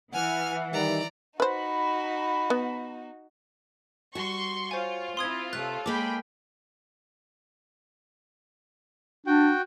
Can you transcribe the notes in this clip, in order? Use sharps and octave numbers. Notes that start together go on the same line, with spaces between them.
E3 F#5 G#5 F6
D#3 G3 D#4 D5 A#5
D#4 F#4 B4 C5 B5
B3
G3 F#4 C6 C#6
F4 C5 C#5 G#5
C4 E4 C6 D#6 G#6
C3 A4 B4 C#5 F#6
G#3 A#3 G#4 G5 B5 D6
D4 F#4 G5